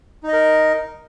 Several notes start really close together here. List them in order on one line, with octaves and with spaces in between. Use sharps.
D#4 D#5 A#4